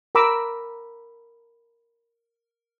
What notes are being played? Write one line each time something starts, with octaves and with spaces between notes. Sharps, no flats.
A#4 A#5 B5 D6 E6